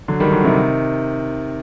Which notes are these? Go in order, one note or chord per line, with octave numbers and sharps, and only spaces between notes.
D3 F#3
D#3 G3
D3 F#3
C3 D#3